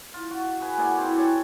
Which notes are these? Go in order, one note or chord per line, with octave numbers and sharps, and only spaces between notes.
F4
F#4
G#4 B4 G#5
A#3 G#4 D5 F#5
C4 E4 C5
G4 A4 C#5